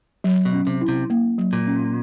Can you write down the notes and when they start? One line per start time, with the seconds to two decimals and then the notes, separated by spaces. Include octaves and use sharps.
0.24 F#3
0.45 B2
0.53 C#4
0.67 C3
0.81 E4
0.88 C3
1.10 A#3
1.38 F#3
1.53 A#2
1.67 C#4